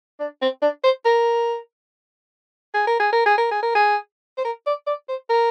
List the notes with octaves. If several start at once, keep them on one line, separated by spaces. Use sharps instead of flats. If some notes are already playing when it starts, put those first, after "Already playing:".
D4
C4
D4
C5
A#4
G#4
A#4
G#4
A#4
G#4
A#4
G#4
A#4
G#4
C5
A#4
D5
D5
C5
A#4